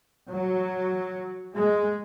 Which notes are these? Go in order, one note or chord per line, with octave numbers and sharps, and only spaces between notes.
F#3
G#3